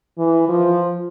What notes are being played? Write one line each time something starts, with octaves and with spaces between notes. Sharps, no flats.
E3
F3